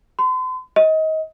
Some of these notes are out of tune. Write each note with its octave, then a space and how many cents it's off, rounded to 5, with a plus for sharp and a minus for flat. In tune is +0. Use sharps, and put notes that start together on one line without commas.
C6 -45
D#5 +25